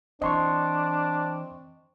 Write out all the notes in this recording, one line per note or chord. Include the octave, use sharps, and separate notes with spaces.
E3 C4 D4 D#5 C6 C#6